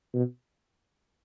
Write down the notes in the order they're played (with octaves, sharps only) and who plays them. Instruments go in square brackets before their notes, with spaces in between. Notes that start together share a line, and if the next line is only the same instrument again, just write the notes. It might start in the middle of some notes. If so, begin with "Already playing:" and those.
[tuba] B2